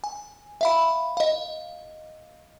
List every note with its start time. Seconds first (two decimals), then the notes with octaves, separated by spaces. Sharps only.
0.04 G#5
0.61 E5 F5 B5
1.17 D#5 F5